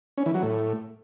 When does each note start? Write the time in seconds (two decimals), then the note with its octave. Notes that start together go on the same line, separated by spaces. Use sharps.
0.18 C#4
0.26 E3
0.34 F#3
0.43 A2